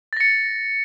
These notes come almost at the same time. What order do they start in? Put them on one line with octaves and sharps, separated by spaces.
A6 A#6 C#7